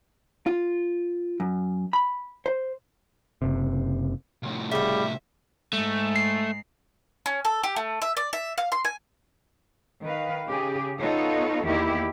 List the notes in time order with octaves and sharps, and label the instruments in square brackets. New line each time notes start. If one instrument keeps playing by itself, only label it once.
[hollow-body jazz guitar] F4
F#2
B5
C5
[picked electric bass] F#1 C3
[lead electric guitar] C2 A2
[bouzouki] C#3 F#4 [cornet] G3 [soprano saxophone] E5
[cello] G#2 G#3 [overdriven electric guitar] A3
[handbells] C7
[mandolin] C#4
A4
G4
A3
E5
D5
E5
F5
C6
G#5
[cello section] D#3 B4 F5
C#3 G4 G#4
B3 D#4 F4 A4 C#5
E2 D#3 A#3 E4 G4